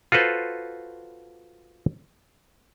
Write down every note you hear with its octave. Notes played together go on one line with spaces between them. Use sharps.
F4 F#4 A4 B4 C5